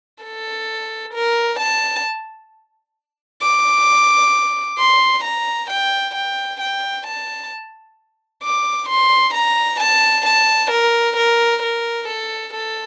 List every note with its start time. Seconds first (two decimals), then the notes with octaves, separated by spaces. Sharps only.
0.24 A4
1.14 A#4
1.59 A5
3.42 D6
4.79 C6
5.24 A#5
5.71 G5
6.15 G5
6.61 G5
7.07 A5
8.44 D6
8.89 C6
9.35 A#5
9.80 A5
10.26 A5
10.71 A#4
11.17 A#4
11.63 A#4
12.08 A4
12.54 A4